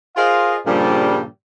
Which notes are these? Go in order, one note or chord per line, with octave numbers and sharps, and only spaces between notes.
F4 G#4 A#4 C5 D#5 F5
G2 A#2 C#3 F3 G3